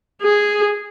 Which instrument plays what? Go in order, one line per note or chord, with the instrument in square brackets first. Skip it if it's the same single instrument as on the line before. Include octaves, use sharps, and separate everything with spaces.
[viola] G#4